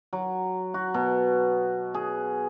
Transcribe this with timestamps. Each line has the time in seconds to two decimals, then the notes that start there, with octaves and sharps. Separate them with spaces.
0.13 F#3
0.74 F#4
0.94 B2
1.94 G#4